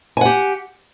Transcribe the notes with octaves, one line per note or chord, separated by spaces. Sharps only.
G4 F#5 G#5